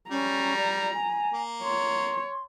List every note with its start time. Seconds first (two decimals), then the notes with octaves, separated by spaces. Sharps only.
0.10 G3 C#4 A#5
0.57 D5
0.94 G#5
1.33 A#3
1.64 C#5 C6